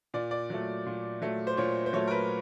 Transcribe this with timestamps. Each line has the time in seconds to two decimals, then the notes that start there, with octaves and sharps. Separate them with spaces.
0.14 A#2 D5
0.31 D5
0.50 F#3 A3
0.86 A#2
1.22 F#3 A3
1.47 C5
1.57 A#2 C#5
1.86 C5
1.93 F#3 A3 C#5
2.07 A#4
2.11 B4